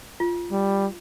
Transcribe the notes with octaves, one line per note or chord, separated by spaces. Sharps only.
F4
G3